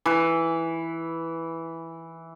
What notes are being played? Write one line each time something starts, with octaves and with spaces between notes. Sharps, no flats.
E3 B4